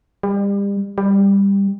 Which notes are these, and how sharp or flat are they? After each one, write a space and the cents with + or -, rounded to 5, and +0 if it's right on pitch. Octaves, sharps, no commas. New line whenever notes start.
G3 +35
G3 +15